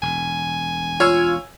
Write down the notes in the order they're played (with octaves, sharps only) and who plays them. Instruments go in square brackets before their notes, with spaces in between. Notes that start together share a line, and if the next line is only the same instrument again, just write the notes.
[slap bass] E1 [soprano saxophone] G#5
[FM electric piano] F4 F5 G#6 [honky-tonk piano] C#5 E6